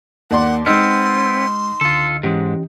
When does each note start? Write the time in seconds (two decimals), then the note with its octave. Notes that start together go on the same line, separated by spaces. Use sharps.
0.31 D#2 A#3 D5 F#5 C6
0.66 G#3 B3 C4 D#4 C6 E6 F6
1.81 C#2 D3 F4 A4
2.23 G#2 E3 G#3 C#4 G4